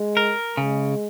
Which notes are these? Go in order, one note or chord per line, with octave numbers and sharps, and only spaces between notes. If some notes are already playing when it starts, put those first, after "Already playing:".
Already playing: G#3
A#4
C#3 G#3